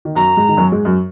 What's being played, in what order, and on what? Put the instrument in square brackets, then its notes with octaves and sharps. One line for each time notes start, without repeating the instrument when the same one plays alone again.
[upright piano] D#3
[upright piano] F#2 F#3 [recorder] A#5
[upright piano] G#2 G#3
D#3
F#2 F#3
G#2 G#3
F#2 F#3